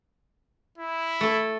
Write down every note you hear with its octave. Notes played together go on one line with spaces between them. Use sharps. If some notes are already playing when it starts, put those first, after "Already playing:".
E4
A3 A4